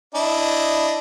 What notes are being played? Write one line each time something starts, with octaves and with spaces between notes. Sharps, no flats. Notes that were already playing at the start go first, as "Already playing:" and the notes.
D4 E4 D#5